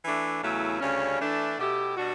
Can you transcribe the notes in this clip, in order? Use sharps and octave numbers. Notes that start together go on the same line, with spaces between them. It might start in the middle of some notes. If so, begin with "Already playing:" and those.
E3 A3 D4
E2 C#3 F#3 A3 E4
D2 C#3 G3 C#4
E3 A3 D4
B2 A3 E4 G4
B2 G3 D4 F#4